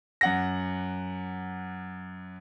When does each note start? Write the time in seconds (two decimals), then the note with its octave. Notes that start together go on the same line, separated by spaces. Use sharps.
0.21 F#2 F#5 A#6